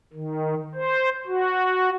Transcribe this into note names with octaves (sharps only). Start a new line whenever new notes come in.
D#3
C5
F#4